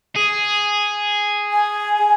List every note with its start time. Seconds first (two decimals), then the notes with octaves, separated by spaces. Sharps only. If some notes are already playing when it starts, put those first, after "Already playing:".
0.16 G#4
1.51 G#5